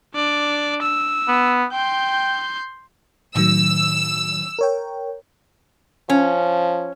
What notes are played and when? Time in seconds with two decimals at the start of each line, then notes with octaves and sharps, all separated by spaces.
0.14 D4 D5
0.82 E6
1.28 B3
1.73 G5 C6 G6
3.35 A2 D#3 F#3 E6
4.59 A#4 C#5 G5
6.10 F3 C#4